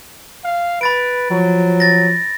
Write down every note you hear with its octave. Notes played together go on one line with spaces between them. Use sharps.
F5
B4 B5 A6 D7
F3 F#3
A6 A#6